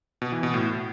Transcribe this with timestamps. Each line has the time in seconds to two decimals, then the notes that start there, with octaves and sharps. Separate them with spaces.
0.22 B2
0.32 E3
0.43 B2
0.54 A2